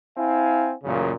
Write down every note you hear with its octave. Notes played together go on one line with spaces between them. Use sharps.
C4 E4 F5 G#5
A1 F#2 A#2 C#3